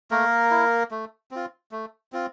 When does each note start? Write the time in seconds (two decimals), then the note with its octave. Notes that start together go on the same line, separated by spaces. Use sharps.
0.11 A3 A#3 A#4
0.51 E4
0.91 A3
1.31 C4 F4
1.71 A3
2.12 C4 F4